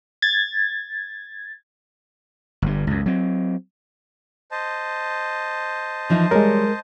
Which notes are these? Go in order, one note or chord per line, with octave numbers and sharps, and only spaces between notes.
G#6 A6
G1 G2
C#2 F#2
F#3 C4
C5 D#5 A5
E3 F3 D#4
G3 G#3 A#4 C#5